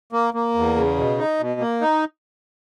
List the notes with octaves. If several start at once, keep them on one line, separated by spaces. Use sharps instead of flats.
A#3
A#3
E2
C#3
B2
D#4
B2
A#3
D#4